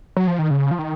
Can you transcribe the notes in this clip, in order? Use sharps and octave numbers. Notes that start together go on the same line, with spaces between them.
F#3
F3
D#3
C#3
F3
D#3